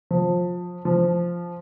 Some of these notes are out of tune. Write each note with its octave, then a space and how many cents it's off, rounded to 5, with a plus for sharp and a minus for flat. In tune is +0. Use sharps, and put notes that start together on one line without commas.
F3 +25
F3 -5